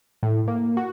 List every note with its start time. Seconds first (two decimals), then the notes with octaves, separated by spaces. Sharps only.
0.23 A2
0.48 A#3
0.77 F#4